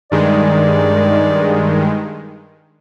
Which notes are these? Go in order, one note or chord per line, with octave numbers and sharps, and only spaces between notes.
G2 D#3 G#3 D5